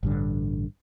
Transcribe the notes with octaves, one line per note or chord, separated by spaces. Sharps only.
A1 G2 D3